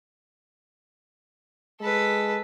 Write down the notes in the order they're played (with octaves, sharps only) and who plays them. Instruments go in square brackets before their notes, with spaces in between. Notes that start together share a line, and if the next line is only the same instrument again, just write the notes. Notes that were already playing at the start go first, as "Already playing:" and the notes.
[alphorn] G#3 [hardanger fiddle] A4 B4